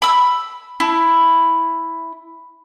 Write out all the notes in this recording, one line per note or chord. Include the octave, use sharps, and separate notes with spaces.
B5 E6
E4